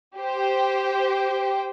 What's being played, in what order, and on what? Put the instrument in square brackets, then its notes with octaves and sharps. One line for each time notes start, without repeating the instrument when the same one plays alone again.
[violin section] G4 C5 G5